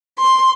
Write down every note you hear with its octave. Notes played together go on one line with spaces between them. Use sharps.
C6